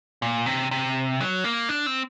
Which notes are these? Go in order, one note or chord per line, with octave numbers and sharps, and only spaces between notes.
A#2
C3
C3
F#3
A#3
D4
C4